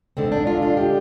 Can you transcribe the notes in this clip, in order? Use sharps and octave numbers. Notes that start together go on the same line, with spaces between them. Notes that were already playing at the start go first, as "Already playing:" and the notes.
D3 G#3 C4
D4
F4
F4
G4